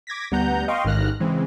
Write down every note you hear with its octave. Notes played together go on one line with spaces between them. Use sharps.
D6 G#6 A#6 B6
D2 G3 B3 F#5 A#5 G6
D#5 F5 G5 C6 C#6
A1 G#2 D#3 F6 F#6 A#6
C#3 E3 G#3 C4